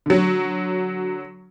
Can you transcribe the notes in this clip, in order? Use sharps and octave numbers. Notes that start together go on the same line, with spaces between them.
D3 F#3